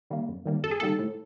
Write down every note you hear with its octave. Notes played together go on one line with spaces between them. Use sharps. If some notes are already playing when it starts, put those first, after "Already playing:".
D#3 G3 A#3
F#2
D#3 G3 A#3
F#2 A4
G#4
D#3 G3 A#3 A4
A2